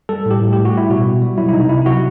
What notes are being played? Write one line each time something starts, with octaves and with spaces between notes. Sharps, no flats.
G3 A4
A2 G4
A2
G3 G4
F#4
G3 E4
B2 F#4
B2
G3
F#3 E4
E4
C3 D#4
C3 E4
E4
F#3 F#4